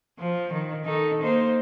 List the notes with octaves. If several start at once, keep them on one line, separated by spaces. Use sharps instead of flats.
F3
D#3
D#3 D#4 A4
A#3 D#4 C5